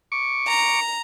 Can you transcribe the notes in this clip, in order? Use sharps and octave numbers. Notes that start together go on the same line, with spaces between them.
C#6 D6
A#5